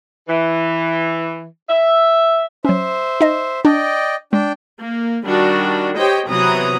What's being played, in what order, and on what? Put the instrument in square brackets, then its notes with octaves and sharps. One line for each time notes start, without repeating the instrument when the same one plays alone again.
[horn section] E3
E5
[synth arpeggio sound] F#3 C#4 [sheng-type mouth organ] C5 E5
[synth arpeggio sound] D#4 D#5
[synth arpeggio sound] D4 [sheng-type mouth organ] D5 D#5 G5
[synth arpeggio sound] G#3 [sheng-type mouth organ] D4 G5
[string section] A#3
D#3 G3 D4 F#4
G4 C5 C#5 D#5 G5
C3 E3 F#3 B3 A#5 D#6